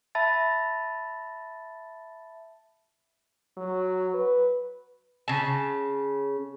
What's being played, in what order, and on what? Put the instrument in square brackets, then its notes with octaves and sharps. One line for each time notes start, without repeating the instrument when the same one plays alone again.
[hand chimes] E5 A5 B5 A6
[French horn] F#3
B4
[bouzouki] C#3 A5